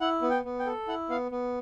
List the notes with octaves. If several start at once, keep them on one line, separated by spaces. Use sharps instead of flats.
E4 F#5
B3
G5
B3
G5
A4
E4 F#5
B3 F5
B3